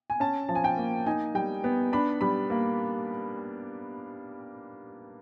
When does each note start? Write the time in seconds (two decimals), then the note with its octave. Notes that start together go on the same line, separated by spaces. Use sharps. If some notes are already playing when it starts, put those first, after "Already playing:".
0.10 G#5
0.20 C#4 A5
0.49 F3 A5
0.55 G#5
0.64 G5
0.77 A#3
1.06 D#4 G#5
1.35 G3 G5
1.64 B3
1.93 D4 B5
2.21 G3 B5
2.50 A#3